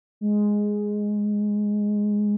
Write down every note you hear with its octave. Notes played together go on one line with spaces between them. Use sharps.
G#3